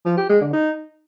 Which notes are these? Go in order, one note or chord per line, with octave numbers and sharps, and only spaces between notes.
F3
G4
G#3
D3
D#4